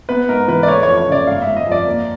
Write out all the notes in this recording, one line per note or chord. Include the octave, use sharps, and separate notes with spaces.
B3 B4
G#2 A#4
E3 B4
D5
A3 C#5
F2 C#5
C#5
C#3 D5
G1 F5
E5
G1
D#5
F2 D5
A#3